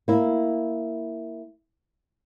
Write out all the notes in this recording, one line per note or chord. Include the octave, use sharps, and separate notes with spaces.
A#3 E4